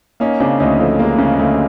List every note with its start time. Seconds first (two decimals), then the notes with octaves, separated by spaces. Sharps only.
0.20 A#3 C#4 D#4
0.40 C#3 C4 D4
0.60 D2 C#4 D#4
0.79 F3 A3
0.99 G#3 A#3
1.19 C#3
1.39 D2 A3